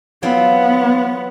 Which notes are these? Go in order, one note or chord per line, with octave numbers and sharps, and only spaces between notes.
F#3 B3 C4 F4